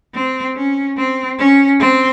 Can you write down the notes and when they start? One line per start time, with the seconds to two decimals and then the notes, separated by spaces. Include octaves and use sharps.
0.15 C4
0.56 C#4
0.97 C4
1.39 C#4
1.80 C4